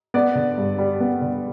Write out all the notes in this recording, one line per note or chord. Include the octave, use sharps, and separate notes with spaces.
B3 D5
D3
G2
G3
B3
D3